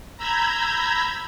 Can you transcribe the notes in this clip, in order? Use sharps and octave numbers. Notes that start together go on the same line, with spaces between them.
A#5 B5 E6 G6 G#6